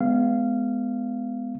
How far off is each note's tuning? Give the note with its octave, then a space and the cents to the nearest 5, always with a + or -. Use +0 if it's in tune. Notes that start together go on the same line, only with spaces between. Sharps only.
G#3 +20 B3 +20 F5 -20